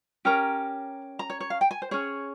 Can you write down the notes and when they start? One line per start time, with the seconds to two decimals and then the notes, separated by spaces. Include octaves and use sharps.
0.25 C#4 G4 A#4 A#5
1.19 A#5
1.30 C#5
1.40 C#5
1.50 F5
1.61 G5
1.71 G#5
1.82 C5
1.91 C#4 G#4 C#5